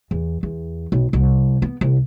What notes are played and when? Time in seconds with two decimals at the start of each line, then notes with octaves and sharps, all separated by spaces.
0.11 E2
0.43 E2
0.92 B1
1.13 C2
1.62 B3
1.81 C2